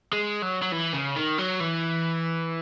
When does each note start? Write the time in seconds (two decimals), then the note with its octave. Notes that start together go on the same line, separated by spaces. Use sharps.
0.13 G#3
0.42 F#3
0.63 F#3
0.72 E3
0.94 C#3
1.16 D#3
1.38 F#3
1.60 E3